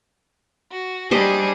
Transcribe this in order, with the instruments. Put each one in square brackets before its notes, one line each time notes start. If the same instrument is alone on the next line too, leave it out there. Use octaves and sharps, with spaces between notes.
[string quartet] F#4
[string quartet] G3 D4 G#4 [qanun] G4 C5 D#5